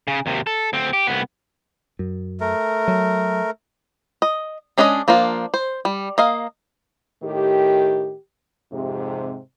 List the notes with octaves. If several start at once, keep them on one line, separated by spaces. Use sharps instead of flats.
C#3
D#2 C3
A4
D2 C4
G4
C2 B3
F#2
A3 A#4
F#3
D#5
G#3 C#4 D4 G#4 D#5
F3 A#3 D4 F4
C5
G3
A#3 D#5 F5
A2 D#3 G4
F2 G#2 C3